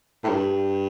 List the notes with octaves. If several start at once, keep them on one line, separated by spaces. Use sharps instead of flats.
A2
G2